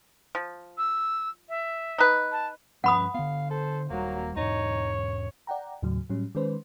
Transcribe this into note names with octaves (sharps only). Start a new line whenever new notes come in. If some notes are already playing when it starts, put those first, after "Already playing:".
F3
E6
E5
D#4 B4
A5
G2 F3 C#4 B4 F#5 B5 D#6
D3 B3 F5
A4 C5
D#1 F#3 G3 A#3
E2 G#2 D#4 C#5
D5 F#5 G5 A#5
D#2 A2 C#3 F#3
A2 F#3 G3 C#4
D#3 G#3 C#4 B4 C5